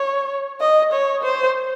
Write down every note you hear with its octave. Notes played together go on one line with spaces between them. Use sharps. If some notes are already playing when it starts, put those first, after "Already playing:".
Already playing: C#5
D#5
C#5
C5